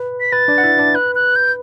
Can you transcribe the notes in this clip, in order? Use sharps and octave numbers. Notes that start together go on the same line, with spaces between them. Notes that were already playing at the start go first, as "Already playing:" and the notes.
Already playing: B4
B6
B4 A6
D4 D5
F#5
E4 E5
D4 D5
B4 F#6
F#6
G6